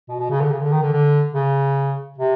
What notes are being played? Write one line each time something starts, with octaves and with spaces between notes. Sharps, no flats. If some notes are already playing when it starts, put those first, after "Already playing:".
B2
B2
C#3
D3
C#3
D3
D#3
D3
D3
C#3
C3